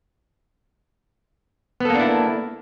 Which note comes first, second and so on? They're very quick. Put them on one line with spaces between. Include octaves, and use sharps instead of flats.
B3 A4 A#3 D4 E4